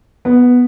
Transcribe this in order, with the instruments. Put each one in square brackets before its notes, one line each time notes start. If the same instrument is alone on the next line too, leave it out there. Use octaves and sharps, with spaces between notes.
[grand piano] B3